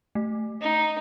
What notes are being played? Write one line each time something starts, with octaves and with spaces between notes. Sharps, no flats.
A3
D#4